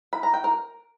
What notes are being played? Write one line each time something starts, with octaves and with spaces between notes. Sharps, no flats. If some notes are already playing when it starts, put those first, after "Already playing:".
B5
A#5
G5
A#4